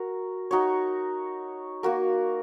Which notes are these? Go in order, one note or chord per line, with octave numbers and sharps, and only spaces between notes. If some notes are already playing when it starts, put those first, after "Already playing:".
Already playing: F#4 A#4
D#4 F#4 C#5
A#3 F#4 A#4